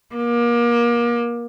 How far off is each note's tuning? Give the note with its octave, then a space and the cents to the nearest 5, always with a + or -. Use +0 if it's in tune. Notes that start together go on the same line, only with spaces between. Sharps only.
A#3 +30